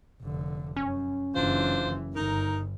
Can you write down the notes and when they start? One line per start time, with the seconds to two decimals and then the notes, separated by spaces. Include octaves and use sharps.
0.22 F1 D3
0.76 F#2 C#4
1.35 F#1 E3 D4 F4 C5
2.16 G1 D#4 A#4